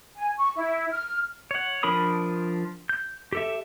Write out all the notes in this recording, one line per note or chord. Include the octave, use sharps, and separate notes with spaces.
G#5
C#6
E4
F6
C#5 F#5
F3 D4 A#4 B5 D#6
G6
G4 A4 E5